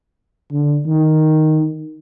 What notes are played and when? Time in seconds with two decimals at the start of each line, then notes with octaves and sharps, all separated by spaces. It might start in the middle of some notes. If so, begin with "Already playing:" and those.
0.52 D3
0.86 D#3